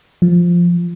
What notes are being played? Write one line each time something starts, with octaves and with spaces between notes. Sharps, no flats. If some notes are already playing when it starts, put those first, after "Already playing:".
F3